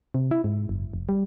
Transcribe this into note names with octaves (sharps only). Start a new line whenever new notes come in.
C3
E4
G#2
F#1
F1
G3